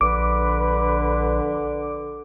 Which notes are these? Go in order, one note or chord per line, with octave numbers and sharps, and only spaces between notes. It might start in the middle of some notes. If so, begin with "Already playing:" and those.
A#1 D3 B4 D6